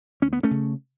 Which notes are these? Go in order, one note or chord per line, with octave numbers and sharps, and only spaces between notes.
D2 C#4
B3
A3 C#4
C#3